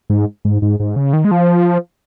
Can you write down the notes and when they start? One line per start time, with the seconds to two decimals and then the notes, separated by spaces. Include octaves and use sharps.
0.10 G#2
0.45 G#2
0.62 G#2
0.80 G#2
0.96 C#3
1.13 D#3
1.25 G#3
1.31 F3